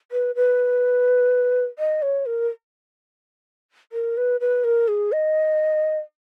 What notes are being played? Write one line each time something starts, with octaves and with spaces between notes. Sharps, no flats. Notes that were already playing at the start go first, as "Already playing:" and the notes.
B4
B4
D#5
C#5
A#4
A#4
B4
B4
A#4
G#4
D#5